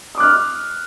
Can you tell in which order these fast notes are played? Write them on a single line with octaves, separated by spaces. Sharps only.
D#6 D6 F#6 F6